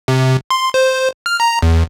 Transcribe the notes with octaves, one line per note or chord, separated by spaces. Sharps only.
C3
C6
C5
F6
A#5
E2